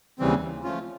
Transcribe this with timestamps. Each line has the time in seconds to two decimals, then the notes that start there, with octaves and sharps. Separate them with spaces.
0.19 D#2 C#3 E3 G3 C4
0.64 F3 A3 C#4 F4